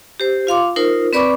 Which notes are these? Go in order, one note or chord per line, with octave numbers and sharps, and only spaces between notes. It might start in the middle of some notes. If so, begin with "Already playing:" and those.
G4 C5
F4 F5 C6 D6
D#4 F4 A#4 C5
C4 B4 D5 B5 C#6 D6